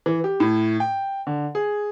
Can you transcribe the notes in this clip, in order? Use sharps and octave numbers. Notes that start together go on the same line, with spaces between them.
E3
G4
A2
G5
D3
G#4